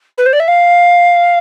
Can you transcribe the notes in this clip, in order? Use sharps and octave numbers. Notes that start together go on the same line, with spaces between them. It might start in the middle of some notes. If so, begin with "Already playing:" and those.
B4
C5
D5
E5
F5